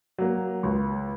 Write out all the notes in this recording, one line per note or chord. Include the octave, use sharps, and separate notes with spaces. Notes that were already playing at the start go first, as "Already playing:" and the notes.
F#3 A#3
C#2